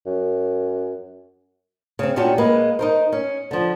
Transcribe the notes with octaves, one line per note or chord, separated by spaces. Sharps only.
F#2
C#3 C4
A#2 C#4 D4 F#4 G4
G#3 A#3 B4
D#4 A#4 C5
C#4
D3 F3